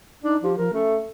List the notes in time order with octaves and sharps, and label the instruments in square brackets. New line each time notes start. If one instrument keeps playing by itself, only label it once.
[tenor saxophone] D4 [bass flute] D#4
[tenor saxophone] F3 [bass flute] G4
[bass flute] F3 [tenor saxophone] A#4
[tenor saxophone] A3 [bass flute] C#4